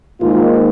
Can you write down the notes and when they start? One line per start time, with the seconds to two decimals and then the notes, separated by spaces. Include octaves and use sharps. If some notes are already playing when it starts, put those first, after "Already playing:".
0.20 G#2 D#3 A#3 F4